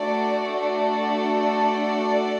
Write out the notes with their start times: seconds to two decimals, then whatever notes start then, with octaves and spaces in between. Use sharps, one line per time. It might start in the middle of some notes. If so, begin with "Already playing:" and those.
Already playing: A3 D4 F#4 A4 D5
0.59 D5